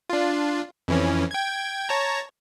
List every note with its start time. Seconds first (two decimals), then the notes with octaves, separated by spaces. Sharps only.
0.10 D4 F4
0.88 F2 E3 C#4
1.31 G5 G#6
1.89 C#5 A5 A#5